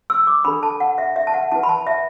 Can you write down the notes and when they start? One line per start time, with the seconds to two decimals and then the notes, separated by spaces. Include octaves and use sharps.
0.10 E6
0.27 D6
0.45 D4 A4 B5
0.63 A5
0.80 F#5
0.98 E5
1.16 E5
1.27 A5
1.34 F#5
1.52 E4 B4 A5
1.63 B5
1.69 A5
1.87 E5